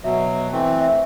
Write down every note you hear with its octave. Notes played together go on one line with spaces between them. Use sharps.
B2 F#3 E5
E3 A3 C4
E5